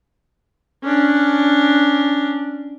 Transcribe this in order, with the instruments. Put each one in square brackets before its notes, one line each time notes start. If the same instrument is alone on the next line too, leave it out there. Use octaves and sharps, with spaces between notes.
[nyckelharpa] C#4 D4